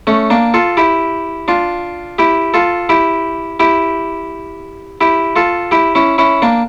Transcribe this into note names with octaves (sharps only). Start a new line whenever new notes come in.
A3 C#4
A#3 D4
F4 A4
E4 G4
D4 F4
E4 G4
F4 A4
E4 G4
E4 G4
E4 G4
F4 A4
E4 G4
C#4 E4
C#4 E4
A#3 D4